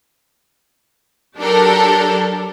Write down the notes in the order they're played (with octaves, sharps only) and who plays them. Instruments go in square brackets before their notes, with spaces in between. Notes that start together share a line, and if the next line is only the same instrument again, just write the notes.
[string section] F#3 D4 G4 A4 A#4